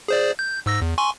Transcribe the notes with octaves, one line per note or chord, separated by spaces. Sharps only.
G#4 C5 D5
G6
G#2 E6 A#6
E2
G#5 C6 C#6